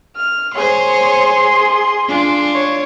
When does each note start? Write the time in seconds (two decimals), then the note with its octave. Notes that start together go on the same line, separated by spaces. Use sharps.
0.16 F6
0.55 G#4 C5 C#5 C6
2.08 D4 F4
2.54 C#5